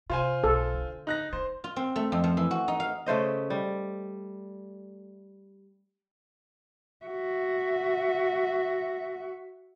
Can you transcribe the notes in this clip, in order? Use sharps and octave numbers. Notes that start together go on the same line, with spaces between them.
C3 F4 C5 G#5
B1 A4
D3
D#4 F#6 A#6
D3 C5
F4
C4
A3
F2
F3
E3
F#4
D#4
F5
C#3 A3 C5 D#5
G3
F#4 E5